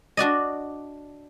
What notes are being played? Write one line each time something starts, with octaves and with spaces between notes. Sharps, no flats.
D4 F#4 D5 D#5